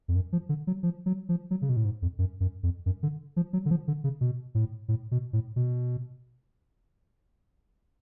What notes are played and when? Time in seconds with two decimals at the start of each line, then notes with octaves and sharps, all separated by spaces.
0.08 F2
0.15 F#2
0.32 F3
0.49 D3
0.67 F#3
0.83 F3
1.06 F#3
1.29 F3
1.51 F#3
1.62 C#3
1.69 B2
1.76 A2
1.85 G#2
2.02 F2
2.18 F#2
2.40 F#2
2.63 F2
2.86 F#2
3.03 D3
3.36 F3
3.53 F#3
3.66 D3
3.70 F3
3.88 D3
4.04 C#3
4.21 B2
4.55 A2
4.88 A2
5.11 B2
5.33 A2
5.56 B2